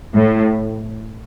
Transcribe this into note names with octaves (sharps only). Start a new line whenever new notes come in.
A2